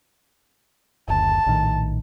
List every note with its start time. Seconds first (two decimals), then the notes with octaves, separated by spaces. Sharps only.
1.08 F#1 D2 A5
1.46 A#1 A2 D#3